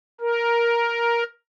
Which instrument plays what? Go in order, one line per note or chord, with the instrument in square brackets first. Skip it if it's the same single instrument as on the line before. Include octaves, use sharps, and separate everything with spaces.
[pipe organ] A#4